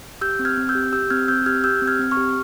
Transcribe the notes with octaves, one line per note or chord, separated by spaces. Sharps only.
G4 E6 G6
C4
F6 G#6
C4
E6 G6
G4
G4 E6 G6
C4 F6 G#6
C4 E6 G6
G4 F6 G#6
G4 E6 G6
C4
F6 G#6
C4
C#6 F6
G4